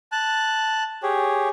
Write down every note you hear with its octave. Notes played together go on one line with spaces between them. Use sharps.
A5 F#6
G4 G#4 C#5